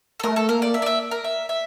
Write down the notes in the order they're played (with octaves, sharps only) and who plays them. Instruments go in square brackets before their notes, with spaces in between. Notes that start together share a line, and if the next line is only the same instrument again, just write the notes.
[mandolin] A4
[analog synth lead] A3 [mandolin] A#4
[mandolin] A4
[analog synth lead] A#3 [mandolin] A#4
[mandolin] D5
E5
D5
E5
A#4
E5
E5